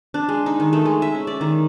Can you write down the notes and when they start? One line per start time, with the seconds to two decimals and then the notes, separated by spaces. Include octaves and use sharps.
0.14 D4
0.29 G#3
0.46 D#4
0.60 D#3
0.73 A3
0.85 G#3
1.02 E5
1.15 C#4
1.27 D5
1.41 D#3